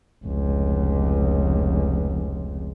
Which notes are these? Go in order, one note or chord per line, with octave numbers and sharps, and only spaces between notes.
F1 C#2